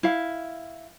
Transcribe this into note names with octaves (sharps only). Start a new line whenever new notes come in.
E4 F5